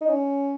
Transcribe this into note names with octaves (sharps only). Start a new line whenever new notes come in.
D#4
C#4